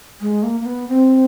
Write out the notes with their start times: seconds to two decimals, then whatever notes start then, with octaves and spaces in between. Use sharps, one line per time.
0.21 G#3
0.43 A#3
0.60 A#3
0.66 B3
0.88 C4